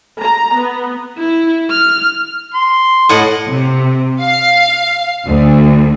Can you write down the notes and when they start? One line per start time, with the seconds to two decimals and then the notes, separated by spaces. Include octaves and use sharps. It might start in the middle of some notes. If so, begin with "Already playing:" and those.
0.21 A#5
0.57 B3
1.18 E4
1.71 F6
2.54 C6
3.09 A2 D#5 F#5
3.48 C3
4.20 F5
5.27 D2